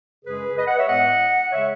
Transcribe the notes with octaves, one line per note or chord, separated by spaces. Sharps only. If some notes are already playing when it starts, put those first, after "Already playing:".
F#2 C#3 G#3 C#4 G#4 B4
B4 D#5
D#5 F#5
C#5 E5
A2 G#3 B3 D#5 F#5
C#3 G#3 C#5 E5